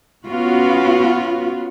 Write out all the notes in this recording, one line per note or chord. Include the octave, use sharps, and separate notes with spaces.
B3 C#4 F4 F#4